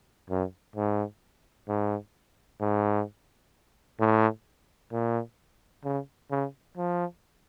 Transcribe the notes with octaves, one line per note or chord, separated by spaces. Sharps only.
F#2
G#2
G#2
G#2
A2
A#2
C#3
C#3
F3